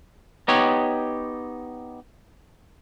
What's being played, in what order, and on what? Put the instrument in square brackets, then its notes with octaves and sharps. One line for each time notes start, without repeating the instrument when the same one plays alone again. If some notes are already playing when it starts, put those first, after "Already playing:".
[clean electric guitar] B3 D#4 G4 C#5